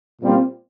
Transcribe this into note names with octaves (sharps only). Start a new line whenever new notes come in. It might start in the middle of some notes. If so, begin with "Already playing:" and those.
A#2 G3 C4 F4